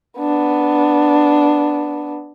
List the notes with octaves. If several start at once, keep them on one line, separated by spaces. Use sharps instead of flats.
B3 D4